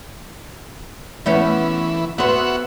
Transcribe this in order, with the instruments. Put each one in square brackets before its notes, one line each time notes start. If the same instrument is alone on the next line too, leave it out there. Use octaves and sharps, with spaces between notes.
[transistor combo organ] E3 [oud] A3 B3 C#4
[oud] B3 C5 [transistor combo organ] F#4 E5 F#5